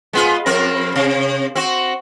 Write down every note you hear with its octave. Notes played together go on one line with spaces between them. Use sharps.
G#3 B3 F4
F2 C4 A#4
C3
C4 F#4